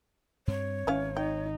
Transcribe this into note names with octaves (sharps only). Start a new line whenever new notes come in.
G2 C4 C#5
G#1 E3 C#4 F5
D#4 G5